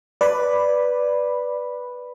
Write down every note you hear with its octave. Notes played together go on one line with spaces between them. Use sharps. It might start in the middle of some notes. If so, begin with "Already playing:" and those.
B4 D5 B5